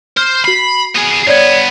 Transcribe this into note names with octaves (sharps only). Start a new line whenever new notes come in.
C5 F6
F#4 B5 C7
B3 G#4
G2 B3 C#5 D5 G#6